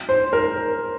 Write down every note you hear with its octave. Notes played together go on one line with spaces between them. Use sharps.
C5
A#4